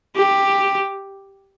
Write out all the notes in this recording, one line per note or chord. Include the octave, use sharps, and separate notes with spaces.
G4